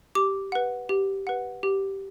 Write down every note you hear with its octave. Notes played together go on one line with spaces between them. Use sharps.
G4 D6
B4 F#5
G4
B4 F#5
G4